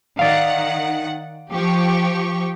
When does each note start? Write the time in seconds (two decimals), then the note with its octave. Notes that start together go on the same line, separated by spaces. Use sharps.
0.19 D#3 D5 F5 F#5
1.51 F3 G4 C#6